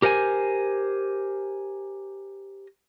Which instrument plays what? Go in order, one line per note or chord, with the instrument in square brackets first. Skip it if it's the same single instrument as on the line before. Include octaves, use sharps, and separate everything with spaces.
[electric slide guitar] G4 A#4 C5 G5 G#5